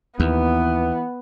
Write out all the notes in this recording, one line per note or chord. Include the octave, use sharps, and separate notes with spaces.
D#2 E3 B3